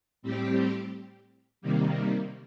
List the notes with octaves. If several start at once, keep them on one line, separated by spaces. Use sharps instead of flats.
A2 G3 C4 G4
C3 D#3 G3 A#3